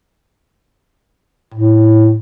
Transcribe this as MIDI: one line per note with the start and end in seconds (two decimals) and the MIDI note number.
1.54 2.17 45